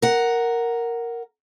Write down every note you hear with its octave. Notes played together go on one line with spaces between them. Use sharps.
A#4 F#5